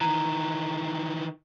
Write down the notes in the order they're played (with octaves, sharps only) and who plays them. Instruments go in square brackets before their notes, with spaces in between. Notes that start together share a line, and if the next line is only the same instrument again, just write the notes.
[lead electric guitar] D#3 E3 [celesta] A#5